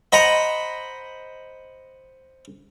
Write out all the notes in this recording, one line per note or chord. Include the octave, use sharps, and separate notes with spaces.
C5 D#5 F#5 A#5 B5